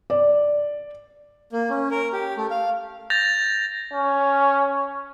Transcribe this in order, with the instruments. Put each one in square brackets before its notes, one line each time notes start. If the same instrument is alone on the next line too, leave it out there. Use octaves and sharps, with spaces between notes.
[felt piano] D5
[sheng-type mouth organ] A#3
C#4
A#4
G4
A3
F5
[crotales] G6 A6 A#6 F7
[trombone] C#4